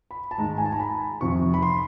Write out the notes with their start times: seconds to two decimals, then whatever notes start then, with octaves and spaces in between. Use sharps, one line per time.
0.11 B5
0.31 A5
0.38 G#2 D#3 G#3 A#5
0.58 G#5
0.66 A5
0.73 A#5
0.80 B5
1.21 F2 C3 D#3 C#6
1.54 B5
1.62 C6